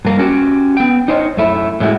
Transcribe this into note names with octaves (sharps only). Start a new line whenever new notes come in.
G2 A#3
C#4 F#4 G4
B3 G5
D#4 C5 C#5 D#5
F#2 A3 E4
A2 G#3 E4 F#4